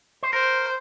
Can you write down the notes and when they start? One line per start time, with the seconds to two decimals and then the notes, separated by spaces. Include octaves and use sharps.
0.23 C5
0.33 A#4 C5